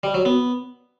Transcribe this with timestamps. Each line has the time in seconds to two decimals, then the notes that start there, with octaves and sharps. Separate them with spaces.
0.03 G3
0.14 F#3
0.25 B3